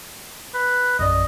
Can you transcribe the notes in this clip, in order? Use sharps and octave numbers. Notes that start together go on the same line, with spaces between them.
B4
A#1 F#2 D5 D#5